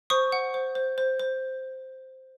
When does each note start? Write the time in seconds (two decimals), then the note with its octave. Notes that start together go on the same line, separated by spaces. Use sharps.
0.10 C5 C#6 D#6
0.32 F#5
0.54 C5
0.75 C5
0.98 C5
1.19 C5